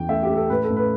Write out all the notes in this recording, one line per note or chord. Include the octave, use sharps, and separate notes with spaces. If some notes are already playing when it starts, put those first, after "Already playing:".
Already playing: E2 E3 G5
A3 E5
G4
A3
A4
A2 B4
A4
A2
B4